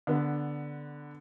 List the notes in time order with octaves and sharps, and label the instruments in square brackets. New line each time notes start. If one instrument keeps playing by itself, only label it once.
[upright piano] D3 B3